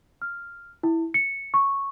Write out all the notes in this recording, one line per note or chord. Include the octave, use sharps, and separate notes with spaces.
F6
E4
C#7
C#6